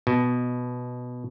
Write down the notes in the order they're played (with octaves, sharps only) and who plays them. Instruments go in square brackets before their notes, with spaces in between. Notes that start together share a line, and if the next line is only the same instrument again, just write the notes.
[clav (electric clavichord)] B2